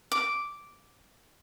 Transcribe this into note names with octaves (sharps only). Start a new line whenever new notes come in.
D6